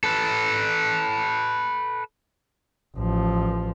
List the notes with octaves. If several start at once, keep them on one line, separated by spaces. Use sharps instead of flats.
A4 B4
A1 F3